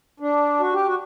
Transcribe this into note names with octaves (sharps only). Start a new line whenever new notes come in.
D4
F#4
G4
F#4